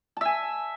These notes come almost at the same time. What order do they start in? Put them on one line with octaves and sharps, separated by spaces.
A5 E5 G#5